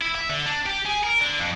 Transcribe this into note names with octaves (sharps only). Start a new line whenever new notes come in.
E4
E5
D3
D4
G4
G#4
A#4
D3
F2